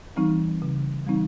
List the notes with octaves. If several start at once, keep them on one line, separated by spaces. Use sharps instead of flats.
E3 G3 C4 D#4
C#3
E3 G3 C4 D#4